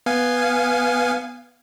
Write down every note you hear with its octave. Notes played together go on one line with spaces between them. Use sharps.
B3 F5 G#5